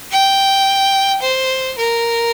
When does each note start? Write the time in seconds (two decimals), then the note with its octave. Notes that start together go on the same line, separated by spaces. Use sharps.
0.11 G5
1.22 C5
1.78 A#4